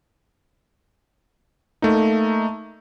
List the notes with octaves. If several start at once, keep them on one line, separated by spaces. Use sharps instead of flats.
A3 A#3 D#4